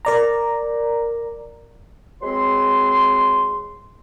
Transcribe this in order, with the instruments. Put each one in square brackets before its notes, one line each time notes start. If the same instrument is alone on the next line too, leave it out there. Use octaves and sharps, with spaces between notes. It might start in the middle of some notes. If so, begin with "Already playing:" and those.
[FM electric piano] A#4 D5 A#5
[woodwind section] F#3 G#3 C4 B4 C6